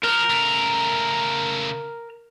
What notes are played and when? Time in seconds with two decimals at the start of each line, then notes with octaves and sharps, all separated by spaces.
0.04 F3 A#4
0.30 C#3 A3